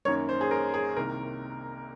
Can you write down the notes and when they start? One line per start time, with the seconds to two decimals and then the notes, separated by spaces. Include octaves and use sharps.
0.05 F#2 D#3 A#3 C#4 C#5
0.29 C5
0.41 G#4
0.51 A#4
0.74 G#4
0.96 C2 C3 D#3 A#3 A#4